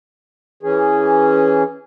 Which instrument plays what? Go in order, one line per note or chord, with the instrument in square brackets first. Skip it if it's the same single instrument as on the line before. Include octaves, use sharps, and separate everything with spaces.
[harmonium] E3 C#4 G#4